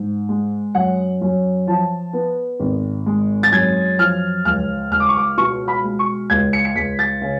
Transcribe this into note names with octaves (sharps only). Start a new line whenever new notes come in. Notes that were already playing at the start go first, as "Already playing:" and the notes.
Already playing: G#2
G#3
F#2 F#5
F#2
F3 A5
B3
G#1
G#3
A6
F#2 G#6
F3 F6
C#2 F6
C#2 F6
D6
C#6
D6
B2 C#6
B5
G#3
C#6
C#2 G#6
C#7
C#7
C#2 B6
A6
C#3